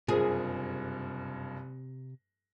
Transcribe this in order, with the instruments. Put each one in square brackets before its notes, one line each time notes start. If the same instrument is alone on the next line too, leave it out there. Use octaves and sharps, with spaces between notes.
[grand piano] F#1 G2 [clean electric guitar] C3 [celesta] F4 A#4 C5 [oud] G#4